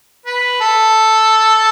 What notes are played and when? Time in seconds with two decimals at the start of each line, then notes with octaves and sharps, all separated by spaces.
0.26 B4
0.61 A4